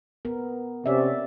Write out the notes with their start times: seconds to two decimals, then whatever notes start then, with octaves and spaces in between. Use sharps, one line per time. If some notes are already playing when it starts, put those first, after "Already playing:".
0.25 B3 A#4
0.86 C3 C#4 D5 E5